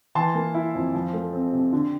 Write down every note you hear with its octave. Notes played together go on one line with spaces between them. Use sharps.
E3 A5 C6
A#3
E4
F2
F3
A3
C4
C3
D3